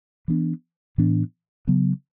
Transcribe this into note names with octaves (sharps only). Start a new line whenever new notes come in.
E3 B3 D4
A2 E3 B3 D4
C#3 F#3 B3